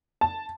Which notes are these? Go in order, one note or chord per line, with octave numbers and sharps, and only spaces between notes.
A5